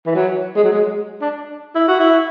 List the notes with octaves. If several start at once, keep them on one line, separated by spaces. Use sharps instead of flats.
E3
F#3
G#3
F#3
G#3
D4
E4
F#4
E4